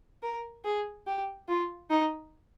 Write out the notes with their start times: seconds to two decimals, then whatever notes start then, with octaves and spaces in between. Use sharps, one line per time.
0.23 A#4
0.64 G#4
1.07 G4
1.48 F4
1.90 D#4